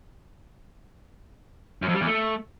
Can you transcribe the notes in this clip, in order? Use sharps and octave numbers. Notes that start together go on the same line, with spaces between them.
F#2
F2
G3
E2
A3